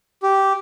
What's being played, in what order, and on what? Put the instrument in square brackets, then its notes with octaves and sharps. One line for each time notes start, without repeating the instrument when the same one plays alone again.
[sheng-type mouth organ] G4